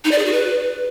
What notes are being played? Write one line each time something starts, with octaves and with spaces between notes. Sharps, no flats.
D#4
D5
G#4
F#4
B4